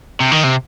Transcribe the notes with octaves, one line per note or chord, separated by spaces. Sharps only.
C3
D#3
C3